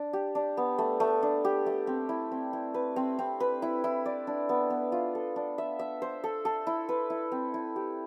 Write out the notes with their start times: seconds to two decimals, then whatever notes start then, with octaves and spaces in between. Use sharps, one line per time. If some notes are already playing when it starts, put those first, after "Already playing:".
Already playing: D4
0.13 G4
0.35 D4
0.57 B3
0.78 A3
1.00 A3
1.23 D4
1.44 G4
1.66 A3
1.87 C4
2.09 E4
2.31 C4
2.53 E4
2.74 B4
2.96 C4
3.19 C4
3.40 B4
3.62 E4
3.84 E4
4.06 D5
4.27 D4
4.49 B3
4.70 B3
4.92 F4
5.15 A4
5.36 D4
5.58 E5
5.79 E5
6.02 C5
6.24 A4
6.45 A4
6.67 E4
6.89 B4
7.10 E4
7.32 C4
7.54 E4
7.76 G4